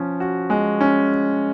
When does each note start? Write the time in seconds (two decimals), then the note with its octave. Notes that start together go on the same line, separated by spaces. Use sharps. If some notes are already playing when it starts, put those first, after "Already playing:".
Already playing: F3 C#4
0.20 F#4
0.50 G#3
0.81 C#4